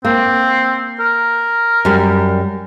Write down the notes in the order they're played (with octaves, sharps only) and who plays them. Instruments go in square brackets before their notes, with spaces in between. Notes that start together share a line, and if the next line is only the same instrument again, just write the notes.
[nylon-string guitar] A#3 [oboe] C4
[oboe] A#4
[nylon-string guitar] F#2 G3